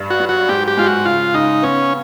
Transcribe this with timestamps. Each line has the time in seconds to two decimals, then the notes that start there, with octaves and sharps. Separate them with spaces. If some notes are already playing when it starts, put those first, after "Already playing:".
Already playing: G2
0.10 F#4
0.20 F#3
0.29 F#4
0.49 G#2 G4
0.68 G4
0.77 G#3 F4
0.86 F#4
1.05 C#3 F4
1.34 C#3 D#4
1.63 B3 C#4